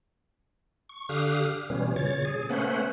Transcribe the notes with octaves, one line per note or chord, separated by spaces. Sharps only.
C#6
D3 G4 F5 D#6 F6 F#6
B2 E3 G3 C#4
A#2 C#3 C#5 A6
G#4
A3 A#3 C#4 B4 C5 F#5